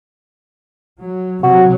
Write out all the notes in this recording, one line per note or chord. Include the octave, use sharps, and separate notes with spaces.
F#3
C3 F#3 F#4